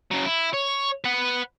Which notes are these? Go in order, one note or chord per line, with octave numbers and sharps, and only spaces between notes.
C#3 F#3
E4
C#5
B4 F#5